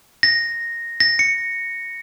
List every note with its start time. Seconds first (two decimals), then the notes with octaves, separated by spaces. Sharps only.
0.23 A#6
1.00 A#6
1.19 C#7